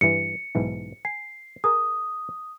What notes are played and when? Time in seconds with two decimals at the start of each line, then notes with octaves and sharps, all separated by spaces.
0.01 G2 E3 C#7
0.55 B1 G#2 E3
1.05 G#5 C7
1.64 G#4 A#4 D#6